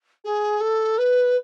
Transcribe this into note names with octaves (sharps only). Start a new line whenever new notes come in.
G#4
A4
B4